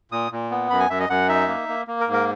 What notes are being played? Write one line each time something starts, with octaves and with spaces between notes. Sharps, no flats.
A#2 D#6
A#2
B3
F#2 B5
G#5
F#2 E5
D#5
F#2 F#5
D#4 E5
A#3
A#3
A#3
A#4
G#2
A#4